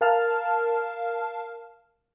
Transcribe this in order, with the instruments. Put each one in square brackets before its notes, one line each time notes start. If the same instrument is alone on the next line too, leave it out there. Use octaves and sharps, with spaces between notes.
[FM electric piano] A#4 F5 A5 F6